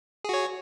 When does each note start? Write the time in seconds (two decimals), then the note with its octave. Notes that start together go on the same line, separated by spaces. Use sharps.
0.24 G#4
0.29 F#4
0.34 C#5